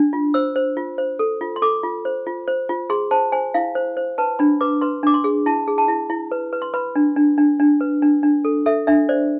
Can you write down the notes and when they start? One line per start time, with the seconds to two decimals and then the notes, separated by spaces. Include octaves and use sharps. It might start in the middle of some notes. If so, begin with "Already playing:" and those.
Already playing: D4
0.13 F4
0.34 C5 E6
0.56 C5
0.77 F4
0.98 C5
1.19 A4
1.41 F4
1.56 C6
1.62 A4 D6
1.83 F4
2.05 C5
2.26 F4
2.48 C5
2.69 F4
2.90 G#4 C6
3.11 C5 A5
3.32 C5 G#5
3.54 E4 F5
3.75 C5
3.97 C5
4.18 B4 A5
4.39 D4 B5
4.61 B4 D6
4.81 B4 C6
5.03 D4 D6
5.14 C6
5.24 G#4
5.46 E4 A5
5.68 G#4
5.78 A5
5.88 E4
6.10 E4
6.32 B4
6.53 B4
6.62 C6
6.74 B4 B5
6.96 D4
7.16 D4
7.38 D4
7.60 D4
7.81 B4
8.02 D4
8.23 D4
8.45 A4
8.66 A4 E5
8.87 D4 E5
9.09 C5 D5